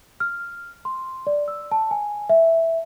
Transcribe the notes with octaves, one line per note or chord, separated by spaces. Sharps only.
F6
C6
D5
E6
A5
G#5
E5